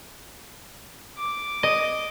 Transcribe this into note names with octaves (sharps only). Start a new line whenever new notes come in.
D6
D#5